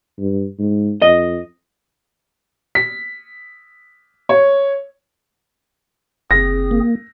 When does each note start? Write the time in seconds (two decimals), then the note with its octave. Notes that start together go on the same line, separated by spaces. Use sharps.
0.18 G2
0.59 G#2
1.02 F2 D#5
2.75 B6
4.29 C#5
6.31 F#1 C4 G#4 A#6
6.71 A#3